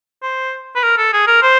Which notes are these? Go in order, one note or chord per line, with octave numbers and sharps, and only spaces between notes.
C5
B4
A#4
A4
G#4
A#4
C5